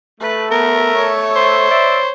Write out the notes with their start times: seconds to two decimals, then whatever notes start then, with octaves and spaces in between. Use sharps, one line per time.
0.21 A3 B4
0.51 B3 A#4
0.96 C#5
1.36 C5
1.68 D5 E5